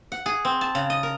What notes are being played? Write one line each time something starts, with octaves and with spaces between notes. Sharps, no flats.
F#5
G#4
C4
A5
C#3
D#5
A#4